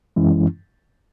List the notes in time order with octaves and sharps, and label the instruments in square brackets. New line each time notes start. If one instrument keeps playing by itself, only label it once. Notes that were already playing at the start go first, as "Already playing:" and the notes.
[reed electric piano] F#2 E3 G#3 C#4 E4